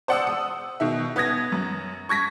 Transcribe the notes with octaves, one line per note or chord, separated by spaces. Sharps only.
C5 D5 F#5 D#6 E6
D#6
B2 D#3 E5
B3 D#6 G#6 A#6
F#2
C#6 G#6 A#6 B6